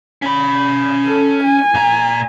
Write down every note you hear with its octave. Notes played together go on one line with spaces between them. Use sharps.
C#4 B5
A4
G#5
A#2 A#5